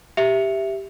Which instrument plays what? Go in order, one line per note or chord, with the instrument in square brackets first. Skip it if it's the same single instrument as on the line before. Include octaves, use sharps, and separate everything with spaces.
[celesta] G4 E5 C#7 F7